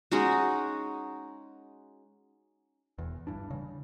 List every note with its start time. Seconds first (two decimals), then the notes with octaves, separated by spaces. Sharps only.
0.12 G#3 C#4 D#4 F#4
2.98 E1 E2
3.27 G1 G2 E3 D4
3.50 C#3 G3